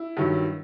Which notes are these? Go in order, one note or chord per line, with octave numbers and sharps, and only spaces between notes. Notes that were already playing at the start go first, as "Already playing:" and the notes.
Already playing: E4
G2 D#3 F#3